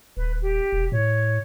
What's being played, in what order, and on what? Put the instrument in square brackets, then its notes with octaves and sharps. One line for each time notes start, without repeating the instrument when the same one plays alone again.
[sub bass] D#1 [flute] B4
[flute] G4
[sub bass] E1
[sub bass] A2 [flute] C#5